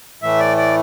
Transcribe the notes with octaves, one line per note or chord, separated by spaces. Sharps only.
A2 E3 A3 E5
D5
D5